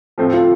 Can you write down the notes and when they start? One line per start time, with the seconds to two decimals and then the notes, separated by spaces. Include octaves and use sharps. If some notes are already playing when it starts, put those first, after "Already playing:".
0.18 A2 F3 A3 C4
0.34 F4